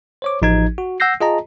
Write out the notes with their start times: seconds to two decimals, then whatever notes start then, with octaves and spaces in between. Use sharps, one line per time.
0.22 C5 C#5 D6
0.42 A1 F3 D#4 F#4 G#6
0.78 F#4
1.00 F#5 E6 G6 A#6 C7
1.21 F4 G#4 D#5 A5 A#5